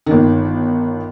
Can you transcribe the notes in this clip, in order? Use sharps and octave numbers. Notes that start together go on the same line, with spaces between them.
G1 D#3